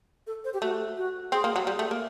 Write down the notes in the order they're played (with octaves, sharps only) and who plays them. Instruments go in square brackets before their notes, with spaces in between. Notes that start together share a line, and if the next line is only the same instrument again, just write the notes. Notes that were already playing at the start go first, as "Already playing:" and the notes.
[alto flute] A4
C5
G4
[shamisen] A3 [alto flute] F#4
[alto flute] F#4
[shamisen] C4 [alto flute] G#4
[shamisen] A#3
F#3
G3
A3
A#3